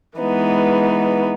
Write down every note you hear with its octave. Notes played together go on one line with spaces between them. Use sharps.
E3 G#3 B3 D#4